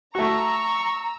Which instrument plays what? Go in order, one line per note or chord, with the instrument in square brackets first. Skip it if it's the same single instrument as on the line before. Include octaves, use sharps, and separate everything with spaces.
[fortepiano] A3 F#4 [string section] A#5 E6 [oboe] C#6